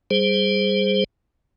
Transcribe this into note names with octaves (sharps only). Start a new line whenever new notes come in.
G3 G#4 C5